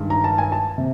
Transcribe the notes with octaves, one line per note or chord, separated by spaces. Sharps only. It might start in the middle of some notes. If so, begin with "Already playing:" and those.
Already playing: G2 D#3 G#3
A#5
A5
G#5
A5
C3